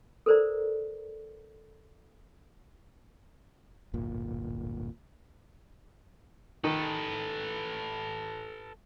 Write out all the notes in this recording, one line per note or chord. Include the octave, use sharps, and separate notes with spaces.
A4 A#4 C5 D5 A#5
D1 G1 A#2
D#3 A4 B4